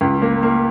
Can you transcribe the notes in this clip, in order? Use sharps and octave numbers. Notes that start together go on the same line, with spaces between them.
C#2
A#3
A#3